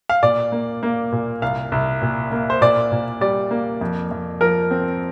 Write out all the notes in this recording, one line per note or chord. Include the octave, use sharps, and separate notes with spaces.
F5
A#2 D5
A#3
A#3
A#2
C2 F5
C2
A#2
A#3
C5
A#2 D5
A#2
G3 D5
A#3
F2
F2
F3 A#4
C4